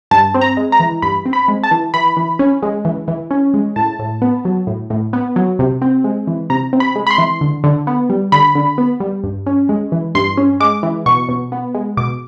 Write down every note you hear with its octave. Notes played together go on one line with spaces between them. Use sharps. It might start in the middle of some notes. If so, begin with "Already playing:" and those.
G2 A5
C4
A#5
G#3
A#5
E3
G2 B5
C4
B5
G#3
A5
E3
E3 B5
E3
C#4
G#3
E3
E3
C#4
G#3
A2 A5
A2
B3
F#3
A2
A2
B3
F#3
C3
C4
G#3
E3
C3 A#5
C4
B5
G#3
B5
C6
E3
D3
D3
B3
G3
D3 B5
D3
B3
G3
G2
C#4
G#3
E3
G2 C6
C#4
G#3 D6
E3
B2 C#6
B2
B3
G#3
B2 D6